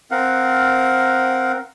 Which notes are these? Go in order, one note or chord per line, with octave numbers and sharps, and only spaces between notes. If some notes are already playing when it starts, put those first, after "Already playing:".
C4 A#4 F5 F#5